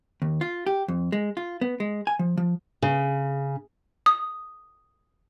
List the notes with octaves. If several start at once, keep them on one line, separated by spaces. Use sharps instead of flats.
D#2
F4
G4
F2
G#3
F4
B3
G#3
G#5
F3
F3
C#3
D#6